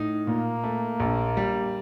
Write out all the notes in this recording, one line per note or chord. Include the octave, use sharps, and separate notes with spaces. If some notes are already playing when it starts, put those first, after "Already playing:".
Already playing: A2 D#4
A#2 A#3
A3
A#1
G3